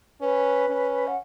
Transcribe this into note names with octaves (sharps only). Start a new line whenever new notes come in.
C#4 B4
C#4
F#5